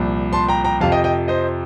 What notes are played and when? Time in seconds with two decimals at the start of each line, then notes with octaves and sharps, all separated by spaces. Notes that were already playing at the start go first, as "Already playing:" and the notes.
Already playing: C2 A#2 F3
0.33 A5 C6
0.48 G5 A#5
0.64 G5 A#5
0.80 F2 C3 F3 F5 A5
0.92 D#5 G5
1.04 D#5 G5
1.28 C5 D#5